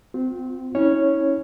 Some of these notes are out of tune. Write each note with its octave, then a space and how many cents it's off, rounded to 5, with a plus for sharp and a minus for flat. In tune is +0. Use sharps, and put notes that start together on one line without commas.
C4 -20 F4 +35
C#4 +0 E4 -35 C#5 +0